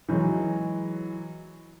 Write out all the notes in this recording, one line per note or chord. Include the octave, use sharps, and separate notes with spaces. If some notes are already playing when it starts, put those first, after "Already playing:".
E3 F#3 G#3